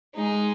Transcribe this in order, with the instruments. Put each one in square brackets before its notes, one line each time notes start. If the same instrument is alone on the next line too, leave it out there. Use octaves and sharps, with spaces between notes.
[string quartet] G#3 D#4 G#4